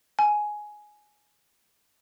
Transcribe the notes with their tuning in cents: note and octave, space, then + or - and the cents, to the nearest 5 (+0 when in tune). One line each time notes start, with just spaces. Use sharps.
G#5 +10